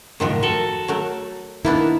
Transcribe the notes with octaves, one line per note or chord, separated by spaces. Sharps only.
C#2 F#2 A2 D#3 F3 F#4
F#4 A4 A#4
F#3 A3 A#4
D#3 A#3 B3 D4 E4